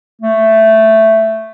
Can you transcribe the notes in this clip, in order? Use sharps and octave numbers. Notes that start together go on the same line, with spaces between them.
A3